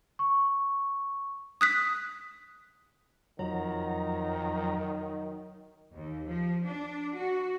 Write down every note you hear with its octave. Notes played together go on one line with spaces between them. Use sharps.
C#6
D#6 F#6 B6
F2 D#3 F#3 A#5
D#2
F3
D4
F#4